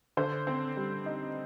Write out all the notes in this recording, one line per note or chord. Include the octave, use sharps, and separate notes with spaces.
D3 C5
C4
G3
D#4